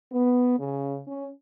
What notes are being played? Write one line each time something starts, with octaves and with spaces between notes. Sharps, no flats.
B3
C#3
C#4